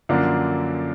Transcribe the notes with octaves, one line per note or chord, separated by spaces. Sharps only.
F#2 D3 F3 A#3 D4